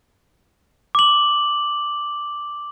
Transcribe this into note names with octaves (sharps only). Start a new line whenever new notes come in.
D6 F#7